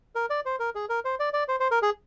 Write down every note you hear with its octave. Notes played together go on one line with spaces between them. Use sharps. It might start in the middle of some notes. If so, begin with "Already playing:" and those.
A#4
D5
C5
A#4
G#4
A#4
C5
D5
D5
C5
C5
A#4
G#4